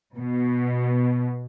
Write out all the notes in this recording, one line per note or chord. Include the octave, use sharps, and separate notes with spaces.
B2